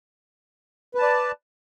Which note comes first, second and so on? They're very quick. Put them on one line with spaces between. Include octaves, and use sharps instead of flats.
B4 A5 D5